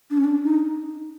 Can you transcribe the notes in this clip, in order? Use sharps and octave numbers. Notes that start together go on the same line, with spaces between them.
D4
C#4
D4
D#4